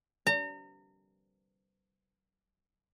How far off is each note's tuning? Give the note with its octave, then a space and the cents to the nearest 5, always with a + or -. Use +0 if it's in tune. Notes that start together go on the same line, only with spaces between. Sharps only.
A#5 -35